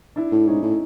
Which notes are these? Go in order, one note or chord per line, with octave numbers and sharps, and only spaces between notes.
D4 E4
A2
G#2 C#4 D#4
A2